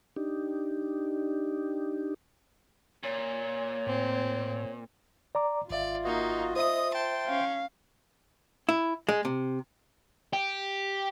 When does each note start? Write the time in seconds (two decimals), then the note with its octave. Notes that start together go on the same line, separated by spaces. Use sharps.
0.16 D4 D#4 G4
3.03 A#2 C#5
3.87 A2 C4
5.35 D5 A#5 D6
5.70 G#1 F4 D5 E5 F5
6.05 A#3 D#4 F#4 D#5
6.56 C5 D#5 E5 D#6
6.94 G5 A5 C6
7.27 C#4 F5
8.69 E4
9.09 G#3
9.25 C3
10.33 G4